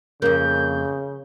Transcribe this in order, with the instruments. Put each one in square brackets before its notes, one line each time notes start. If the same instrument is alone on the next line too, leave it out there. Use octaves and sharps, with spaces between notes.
[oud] F2 A#3 [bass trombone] C#3 [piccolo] G6